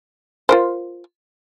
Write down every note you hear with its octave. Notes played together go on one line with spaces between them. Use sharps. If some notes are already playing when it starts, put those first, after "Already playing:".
F4 A#4 C5